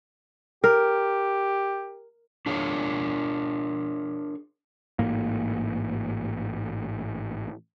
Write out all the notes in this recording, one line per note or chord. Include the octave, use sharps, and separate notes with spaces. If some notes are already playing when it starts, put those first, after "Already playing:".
G4 A#4
D4 G#4 A#4 C#5
A1 G#2 A#3